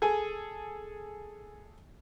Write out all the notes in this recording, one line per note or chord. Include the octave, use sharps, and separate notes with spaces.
G#4 A4 G#5